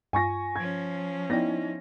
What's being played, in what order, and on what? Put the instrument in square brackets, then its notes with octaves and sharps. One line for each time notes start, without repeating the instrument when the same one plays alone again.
[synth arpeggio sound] G2 F4 [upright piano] G#5 C#6 A#6
[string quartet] F3 C#4 [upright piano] G#6
[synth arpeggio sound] B3 D5 G5 [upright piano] D#4 E4 A#6